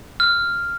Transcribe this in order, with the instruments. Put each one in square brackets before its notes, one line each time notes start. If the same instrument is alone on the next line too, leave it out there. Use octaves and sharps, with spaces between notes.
[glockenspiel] F6